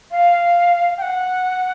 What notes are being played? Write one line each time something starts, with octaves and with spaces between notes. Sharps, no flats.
F5
G5
F#5